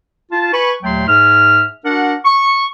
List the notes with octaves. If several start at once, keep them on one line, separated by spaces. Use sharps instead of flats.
F4 A5
B4 G#5 B5 C#6
D#2 A#2 F#3 A3 G5 C6
G#2 G#4 E5 F6
D4 F#4 A#4 F#5
C#6